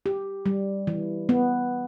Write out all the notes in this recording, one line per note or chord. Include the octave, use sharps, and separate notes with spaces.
G4
G3
E3
B3